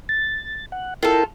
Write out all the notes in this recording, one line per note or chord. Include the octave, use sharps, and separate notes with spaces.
A6
F#5
E4 F4 A4 A#4 G5